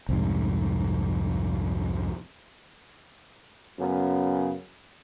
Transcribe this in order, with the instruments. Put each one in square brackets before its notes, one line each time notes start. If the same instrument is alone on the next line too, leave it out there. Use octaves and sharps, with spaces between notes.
[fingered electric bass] C2 F2 G#2
[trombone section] F#2 C#3 B3